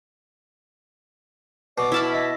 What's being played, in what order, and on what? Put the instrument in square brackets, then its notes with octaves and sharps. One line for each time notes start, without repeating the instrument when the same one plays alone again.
[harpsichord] B2 [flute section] D5 [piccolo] D6
[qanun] E4 A5 B5 [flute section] E6 F6
[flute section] D#5 E5 E6 [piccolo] B6